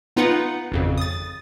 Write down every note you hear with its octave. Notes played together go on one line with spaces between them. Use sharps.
B3 D#4 F4 B4 F#5
G#1 F2 C#3
D#6 A6